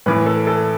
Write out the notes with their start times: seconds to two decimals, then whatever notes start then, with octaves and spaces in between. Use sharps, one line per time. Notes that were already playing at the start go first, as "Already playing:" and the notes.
0.06 A2 E3 B4
0.26 A4
0.47 A4